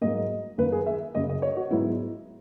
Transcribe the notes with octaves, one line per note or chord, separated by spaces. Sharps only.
G#2 F#3 A#3 D#5
F#2 D#3 A#3 B4
G#4
E5
F#2 C#3 F#3 A#3 D#5
D#5
C#5
F#4
G#2 F#3 B3 E4